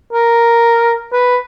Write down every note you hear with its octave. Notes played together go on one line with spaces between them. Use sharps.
A#4
B4